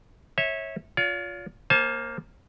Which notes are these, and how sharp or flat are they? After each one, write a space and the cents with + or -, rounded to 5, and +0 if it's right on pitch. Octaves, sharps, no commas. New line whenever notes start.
C#5 -20 E5 -20
F4 +15 C#5 +45
A#3 +0 C5 +30 A5 -35